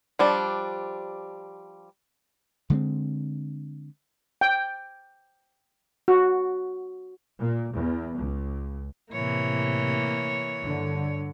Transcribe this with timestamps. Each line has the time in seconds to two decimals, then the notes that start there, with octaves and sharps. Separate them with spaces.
0.19 F3 G3 D4
2.70 D3 G#3 A#3 C4
4.41 G5
6.08 F#4
7.39 A#2
7.75 E2
8.18 C#2
9.12 A2 C3 E3 A#3 C#5
10.61 G2 D3